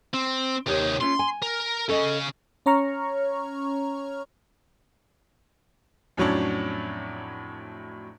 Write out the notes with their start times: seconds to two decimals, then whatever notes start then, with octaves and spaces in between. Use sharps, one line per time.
0.14 C4
0.67 D#2 C3 D#4 G4 C#5
1.01 A3 C#4 F4 C6
1.19 G#5
1.42 A#4
1.89 C#3 C#4 A4 D#5
2.66 C#4 C#5 A#5 C#6 F6
6.17 F2 A2 F#3 C#4 D4